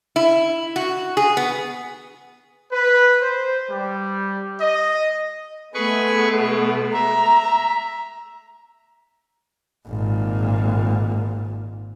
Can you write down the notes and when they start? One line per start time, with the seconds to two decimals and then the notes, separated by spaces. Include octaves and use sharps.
0.16 E4
0.76 F#4
1.17 G#4
1.37 B3
2.72 B4
3.22 C5
3.69 G3
4.60 D#5
5.74 G#3 A3 B3 G#4 B4 C#6
6.36 B2
6.94 E5 A#5
9.87 G#1 A#2